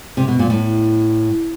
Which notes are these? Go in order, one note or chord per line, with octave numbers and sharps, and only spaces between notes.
C3
B2
A#2
A2